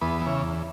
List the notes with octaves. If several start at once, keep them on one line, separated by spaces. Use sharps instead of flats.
E2 B3
C#3 E3
E2